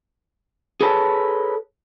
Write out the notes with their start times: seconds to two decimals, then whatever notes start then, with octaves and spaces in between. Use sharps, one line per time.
0.81 G#4 A4 B4 C#5 A5